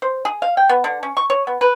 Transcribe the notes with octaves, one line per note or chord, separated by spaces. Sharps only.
C5
G#4
F5
G5
B3
D3
C#4
C#6
C#5
B3
B4